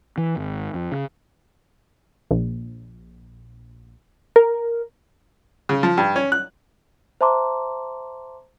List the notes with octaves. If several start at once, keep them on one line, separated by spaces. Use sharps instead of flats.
E3
G#1
F2
C#3
A#1
A#4
C#3
F3
G2
C#4
F#6
C5 E5 A5 A#5 C6 D6